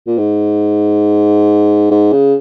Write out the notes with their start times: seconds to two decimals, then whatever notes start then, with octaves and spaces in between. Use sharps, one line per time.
0.07 A#2
0.18 G#2
1.91 G#2
2.12 C#3